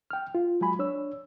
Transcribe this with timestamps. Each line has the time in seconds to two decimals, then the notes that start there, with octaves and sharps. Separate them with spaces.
0.11 G5 F6
0.35 F4
0.61 F#3 G#3 G#5 B5
0.79 D4 C#5 E6